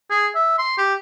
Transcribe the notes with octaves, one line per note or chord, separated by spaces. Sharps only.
G#4
E5
C6
G4